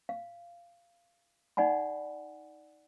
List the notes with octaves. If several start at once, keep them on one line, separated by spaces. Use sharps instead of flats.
F5
D#4 D5 F#5 G#5 B5